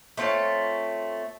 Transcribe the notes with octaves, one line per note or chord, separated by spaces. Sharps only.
A3 C4 F4 C#5